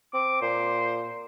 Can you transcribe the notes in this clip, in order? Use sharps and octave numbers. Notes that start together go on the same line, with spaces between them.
C4 D6
A#2 C5